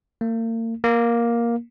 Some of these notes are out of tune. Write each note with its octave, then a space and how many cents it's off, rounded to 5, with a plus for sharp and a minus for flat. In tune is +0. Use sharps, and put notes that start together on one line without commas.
A#3 -40
A#3 +10